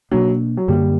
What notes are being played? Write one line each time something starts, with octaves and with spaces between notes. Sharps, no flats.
B2 F#3 A#3 D4
F#3
F#2 D3 G3 A#3